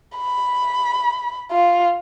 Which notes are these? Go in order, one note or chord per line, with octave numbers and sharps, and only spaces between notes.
B5
F4